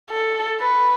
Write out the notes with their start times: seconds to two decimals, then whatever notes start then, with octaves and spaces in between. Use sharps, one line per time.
0.10 A4
0.61 B4